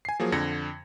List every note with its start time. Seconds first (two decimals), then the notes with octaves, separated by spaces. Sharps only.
0.05 G#5 C7
0.20 F3 F#3 A#3 G#4
0.32 F2 D3 G#6 A#6 C#7